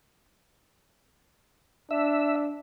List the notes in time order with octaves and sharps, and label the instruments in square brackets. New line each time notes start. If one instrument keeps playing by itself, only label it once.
[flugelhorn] D4 [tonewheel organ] E5